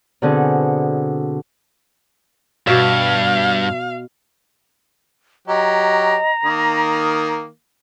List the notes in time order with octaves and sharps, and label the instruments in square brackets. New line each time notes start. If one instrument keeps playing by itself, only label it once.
[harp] B2 D3 C4 G#4
[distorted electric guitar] G2 [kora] B2 E5 [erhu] F5
[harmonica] F#3 G4 [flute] D#5 [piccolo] A#5
[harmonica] D#3 A#3 [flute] D#6